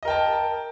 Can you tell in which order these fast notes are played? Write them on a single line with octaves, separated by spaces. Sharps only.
D#5 A#4 G5 A5